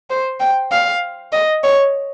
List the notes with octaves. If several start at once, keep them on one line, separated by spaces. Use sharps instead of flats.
C5
G5
F5
D#5
C#5